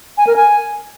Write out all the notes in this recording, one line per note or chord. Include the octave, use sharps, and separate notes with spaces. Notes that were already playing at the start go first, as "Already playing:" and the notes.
G#5
A#4
G#5